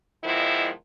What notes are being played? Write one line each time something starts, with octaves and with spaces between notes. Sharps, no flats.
B2 D#3 F3 G#3 E4